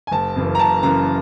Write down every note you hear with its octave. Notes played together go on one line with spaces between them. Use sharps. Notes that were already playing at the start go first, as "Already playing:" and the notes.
G#5
F#1 A5
F#2 C#3 E3
A#5
F#1 A5
F#2 C#3 E3 A#5